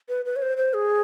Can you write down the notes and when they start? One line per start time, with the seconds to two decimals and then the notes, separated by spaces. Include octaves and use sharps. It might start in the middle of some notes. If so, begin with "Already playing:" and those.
0.09 B4
0.25 B4
0.36 C#5
0.42 C5
0.57 C5
0.74 G#4